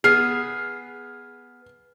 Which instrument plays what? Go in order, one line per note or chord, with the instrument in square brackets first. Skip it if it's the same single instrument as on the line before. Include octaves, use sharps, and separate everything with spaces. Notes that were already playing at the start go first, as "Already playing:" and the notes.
[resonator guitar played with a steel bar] B3 G#4 [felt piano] F6 C7